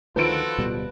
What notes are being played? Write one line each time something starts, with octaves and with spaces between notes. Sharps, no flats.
D2 D#3 F3 F4 F#4 A4 B4 D7
D1 B2 G3